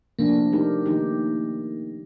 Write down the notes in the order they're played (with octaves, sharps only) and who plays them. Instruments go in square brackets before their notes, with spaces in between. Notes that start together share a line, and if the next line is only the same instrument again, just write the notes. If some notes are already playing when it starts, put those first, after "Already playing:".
[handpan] C3 F3 A3 D4 [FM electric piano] A#3
[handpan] A3 D#4 G4 A#4
D#3 A3 D#4 G4